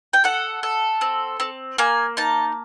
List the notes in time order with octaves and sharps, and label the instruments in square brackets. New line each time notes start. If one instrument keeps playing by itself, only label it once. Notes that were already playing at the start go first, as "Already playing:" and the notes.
[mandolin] G5
A4 F#5
A4
C4
C4
A#3 G#5
D#4 A5